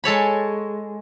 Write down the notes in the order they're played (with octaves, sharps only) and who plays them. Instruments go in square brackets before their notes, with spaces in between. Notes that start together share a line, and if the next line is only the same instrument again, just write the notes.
[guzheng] G#3 A4 C#5 B5